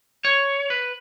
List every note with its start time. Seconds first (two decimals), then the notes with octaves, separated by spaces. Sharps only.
0.25 C#5
0.70 B4